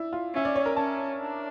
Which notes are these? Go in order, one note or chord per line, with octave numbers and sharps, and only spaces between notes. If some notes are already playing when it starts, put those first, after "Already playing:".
Already playing: D4 E4
F4
C#4 E5
D5
C#5
A#4
C#4 A5
D4